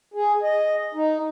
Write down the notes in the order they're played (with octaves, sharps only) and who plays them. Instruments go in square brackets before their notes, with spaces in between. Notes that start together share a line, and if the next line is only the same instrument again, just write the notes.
[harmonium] G#4
D#5
D#4